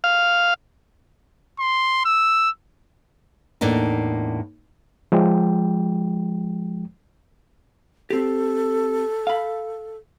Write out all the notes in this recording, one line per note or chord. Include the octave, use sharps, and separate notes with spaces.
F5
C6
E6
E2 A2 A#3 D4 D#4
F3 G#3 G5
C4 G4 A4
F5 B5